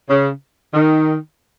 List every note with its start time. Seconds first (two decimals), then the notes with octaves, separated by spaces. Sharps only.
0.09 C#3
0.74 D#3